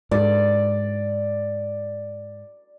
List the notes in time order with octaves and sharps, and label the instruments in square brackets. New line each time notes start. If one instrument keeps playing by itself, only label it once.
[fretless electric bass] G#2 [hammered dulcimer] D5